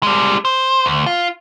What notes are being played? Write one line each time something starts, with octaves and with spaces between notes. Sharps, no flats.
G3 G#3
C5
D2
F4